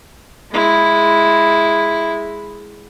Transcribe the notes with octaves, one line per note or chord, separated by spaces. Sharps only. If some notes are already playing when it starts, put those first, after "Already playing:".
G#3 E4